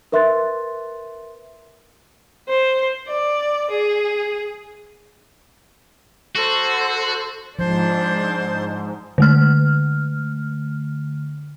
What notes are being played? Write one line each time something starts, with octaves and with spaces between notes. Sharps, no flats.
A#4 B4 E5 C6 F#6 A6
C5
D5
G#4
F#4 A4 C5
G#2 F3 D4 C5
D3 A3 F6